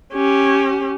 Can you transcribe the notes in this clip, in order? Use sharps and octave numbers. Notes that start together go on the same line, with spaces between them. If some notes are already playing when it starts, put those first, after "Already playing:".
C#4 G4